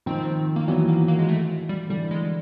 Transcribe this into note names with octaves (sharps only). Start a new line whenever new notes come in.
D#3 F3 C4
A#3
E3 F#3 B3
A#3
A#3
G#3
A3
G3
D3 E3 G3
G#3